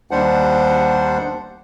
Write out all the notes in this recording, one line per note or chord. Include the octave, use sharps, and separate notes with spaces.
D#2 G3 D4 C5 F#5